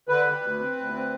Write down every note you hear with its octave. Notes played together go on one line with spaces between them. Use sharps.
D3 B4
G3
D2
C4
D2
C4